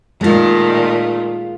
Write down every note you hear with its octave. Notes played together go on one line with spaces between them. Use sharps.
A#2 D#3 G#3 A3 F4